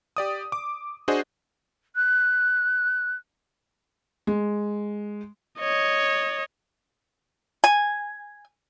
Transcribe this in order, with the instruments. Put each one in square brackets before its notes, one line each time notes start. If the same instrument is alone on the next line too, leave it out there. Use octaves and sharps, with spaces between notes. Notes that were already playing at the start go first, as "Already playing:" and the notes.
[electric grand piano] G4 D5 D#6
D6
D4 F#4 G#4 C5 D#5
[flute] F#6
[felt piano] G#3
[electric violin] C#5 D#5
[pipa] G#5